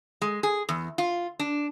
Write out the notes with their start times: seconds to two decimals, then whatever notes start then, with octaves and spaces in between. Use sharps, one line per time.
0.21 G#3
0.43 G#4
0.69 E2
0.98 F4
1.39 D4